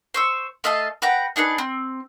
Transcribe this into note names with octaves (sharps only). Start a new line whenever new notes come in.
C5 C#6 E6
A3 D#5 F5 A5
B4 F#5 G5 A#5
D4 D#4 G#4 B4
C4